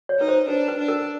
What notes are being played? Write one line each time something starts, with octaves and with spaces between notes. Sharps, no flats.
C#5
D#4 B4
C5
D4 B4
B4
D4
A#4